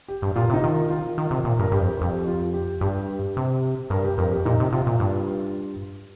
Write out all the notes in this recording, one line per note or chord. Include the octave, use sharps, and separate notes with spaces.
G4
G2
A#2 F4
C3 D#4
D#3 F4
F4
D#3
C3
A#2
G2 A#4
G2 G4
F2
F2 G4
F4
G4
G2 G4
C3
G2 A#4
G4
F2 A#4
G4
A#2 D#4
C3
C3 F4
A#2
G2